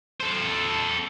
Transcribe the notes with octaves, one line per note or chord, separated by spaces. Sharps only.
A4 C5